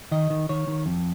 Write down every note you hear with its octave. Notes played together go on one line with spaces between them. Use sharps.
D#3 D#5
D#3
D#3 C#5
D#3
F2